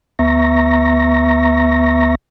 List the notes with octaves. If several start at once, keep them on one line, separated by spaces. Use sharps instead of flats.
D2 B3 E5 A#5 C#6 A#6